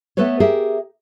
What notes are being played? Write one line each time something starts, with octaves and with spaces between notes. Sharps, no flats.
A3 B3 A4 B4 C#5
G4 G#4 A#4 E5